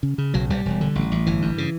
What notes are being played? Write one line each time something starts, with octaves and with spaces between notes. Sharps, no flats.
C#3
C#3
B1 F#3
B1 G3
E1
D3
A1
A1
G1 E3
G2
C#3